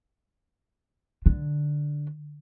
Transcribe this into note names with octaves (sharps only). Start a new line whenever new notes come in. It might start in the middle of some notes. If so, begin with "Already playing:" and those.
D3